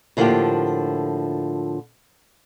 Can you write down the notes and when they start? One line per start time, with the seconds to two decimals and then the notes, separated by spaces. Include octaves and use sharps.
0.17 A2 D3 F3 A#3 F4 G4